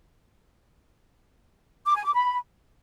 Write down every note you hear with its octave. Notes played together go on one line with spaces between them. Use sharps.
D6
G#5
D6
B5